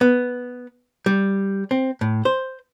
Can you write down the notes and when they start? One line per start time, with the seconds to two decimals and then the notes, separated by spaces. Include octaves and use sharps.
0.01 B3
1.06 G3
1.71 C4
2.01 A2
2.25 C5